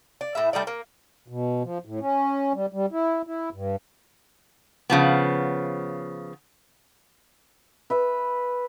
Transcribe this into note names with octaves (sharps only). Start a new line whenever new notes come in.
D5
A2 E4 E5
G3 A3 D#4 D5
A#3
B2
F3
A2
C#4
G3
G3
E4
E4
G2
C#3 F3 B3
B4 E5